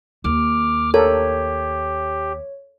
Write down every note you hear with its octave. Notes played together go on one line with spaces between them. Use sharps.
D#2 D6 F6
G4 A4 A#4 C#5